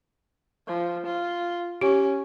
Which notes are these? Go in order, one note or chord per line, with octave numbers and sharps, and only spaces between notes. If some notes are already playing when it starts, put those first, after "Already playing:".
F3
F4
C#4 G4